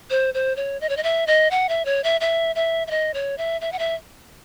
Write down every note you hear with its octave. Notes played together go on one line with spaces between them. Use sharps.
C5
C5
C#5
D#5
C#5
D#5
E5
D#5
F#5
E5
C#5
E5
E5
E5
E5
D#5
C#5
E5
E5
F#5
E5